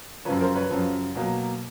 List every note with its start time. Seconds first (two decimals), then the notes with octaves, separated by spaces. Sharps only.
0.25 F3 B4 C#5
0.28 F#2 C#3
0.41 A#4 C5
0.55 B4 C#5
0.71 F#2 C#3 F3
1.15 B2 F#3 A#3